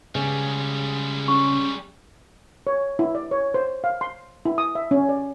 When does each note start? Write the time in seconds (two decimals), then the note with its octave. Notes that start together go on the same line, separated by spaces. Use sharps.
0.15 C#3 G3 G#3
1.28 C#4 C#6
2.67 C#5
2.99 E4
3.15 D5
3.31 C#5
3.54 C5
3.84 F5
4.01 C6
4.45 E4
4.58 D#6
4.75 E5
4.91 C#4
5.09 D5